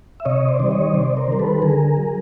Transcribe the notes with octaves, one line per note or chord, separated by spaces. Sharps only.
E5
C3 C#5 D#5
C5 D5
D#3 G3
C#5 D#5
C3 C5 D5
A#4 C5
D#3 G3
A4 B4
D3 G#4 A#4
F#3